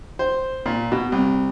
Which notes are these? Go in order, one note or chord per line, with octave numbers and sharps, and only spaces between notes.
C5
A#2
B2
C2